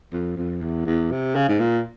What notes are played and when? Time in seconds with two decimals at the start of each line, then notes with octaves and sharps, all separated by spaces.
0.12 F2
0.37 F2
0.62 E2
0.86 E2
1.11 C3
1.35 C#3
1.48 G#2
1.60 A#2